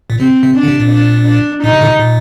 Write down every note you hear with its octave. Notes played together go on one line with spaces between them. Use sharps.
A#2
C3 C4
C3
D4
D3
C3
A#2
D4
D4
A#2 D#4
C3
A#2 D3
C3
A#2